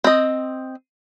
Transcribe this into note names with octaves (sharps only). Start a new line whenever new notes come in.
C4 D#5